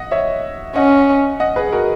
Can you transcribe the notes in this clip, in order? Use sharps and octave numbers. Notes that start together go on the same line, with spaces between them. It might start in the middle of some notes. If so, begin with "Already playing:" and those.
Already playing: D#5 F#5
C#5 E5
C#4 D#5 F#5
D#5 F#5
G#4 B4
F#4 A#4